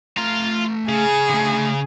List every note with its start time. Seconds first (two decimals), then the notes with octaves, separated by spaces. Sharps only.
0.18 A3 F4 A#5
0.89 C#3 G#4
1.30 D3 A3